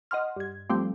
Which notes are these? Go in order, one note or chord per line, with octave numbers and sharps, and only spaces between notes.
D#5 F#5 C6 F6
G2 G#6
F3 G3 A3 C4